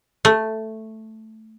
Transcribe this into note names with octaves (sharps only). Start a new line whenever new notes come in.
A3